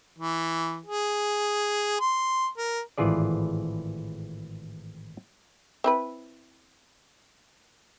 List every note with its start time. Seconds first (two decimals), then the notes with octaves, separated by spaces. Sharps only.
0.19 E3
0.86 G#4
2.00 C6
2.57 A#4
2.98 G#1 A2 E3 F4 G#4 D5
5.84 C4 E4 B4